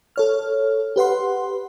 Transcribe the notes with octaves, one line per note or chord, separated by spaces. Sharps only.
A4 C#5 F6
G4 B4 F#5 C6